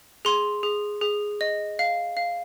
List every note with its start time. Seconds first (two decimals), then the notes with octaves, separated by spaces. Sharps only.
0.25 G#4 C6
0.63 G#4
1.02 G#4
1.41 D#5
1.79 F5
2.17 F5